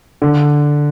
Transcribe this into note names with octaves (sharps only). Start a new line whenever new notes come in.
D3